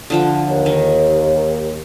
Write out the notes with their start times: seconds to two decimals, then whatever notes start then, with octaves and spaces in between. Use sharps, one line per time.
0.10 D3 F3 G5
0.48 D#2
0.66 D#3